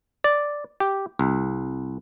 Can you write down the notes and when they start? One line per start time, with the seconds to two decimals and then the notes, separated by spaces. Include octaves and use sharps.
0.24 D5
0.80 G4
1.19 C2